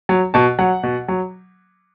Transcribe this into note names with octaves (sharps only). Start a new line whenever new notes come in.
F#3
B2 A5
F#3 F#5
B2
F#3